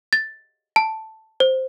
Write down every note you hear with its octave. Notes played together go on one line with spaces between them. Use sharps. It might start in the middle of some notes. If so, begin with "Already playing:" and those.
A6
A5
C5